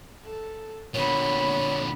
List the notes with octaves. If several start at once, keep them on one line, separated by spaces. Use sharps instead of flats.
A4
A#2 D3 B3 C#5 B5